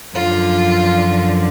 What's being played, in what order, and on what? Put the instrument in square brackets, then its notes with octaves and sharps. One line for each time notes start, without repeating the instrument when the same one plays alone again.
[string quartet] F#2 D3 F3 F4